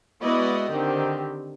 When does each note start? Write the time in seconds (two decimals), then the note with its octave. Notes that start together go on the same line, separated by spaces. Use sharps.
0.22 G#3 B3 E4 F#4 D5 D#5
0.72 D3 D#3 C4 G4